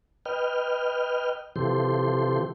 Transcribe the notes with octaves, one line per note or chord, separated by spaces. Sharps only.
B4 D#5 G5 F6
C3 E3 F3 G4 A4 C6